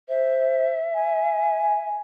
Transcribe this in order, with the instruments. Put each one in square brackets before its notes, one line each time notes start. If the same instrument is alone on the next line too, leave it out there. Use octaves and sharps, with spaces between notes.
[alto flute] C5 [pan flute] E5
[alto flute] G#5